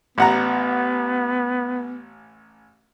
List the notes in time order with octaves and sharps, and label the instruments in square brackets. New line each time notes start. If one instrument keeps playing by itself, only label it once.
[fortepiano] A1 F#5 A#5 [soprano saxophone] B3